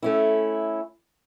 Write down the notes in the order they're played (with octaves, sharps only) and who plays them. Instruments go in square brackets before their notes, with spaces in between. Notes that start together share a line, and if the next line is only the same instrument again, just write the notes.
[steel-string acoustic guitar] A3 C#4 E4